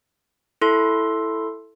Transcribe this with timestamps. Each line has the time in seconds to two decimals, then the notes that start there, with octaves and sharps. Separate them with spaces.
0.61 E4 A4 C6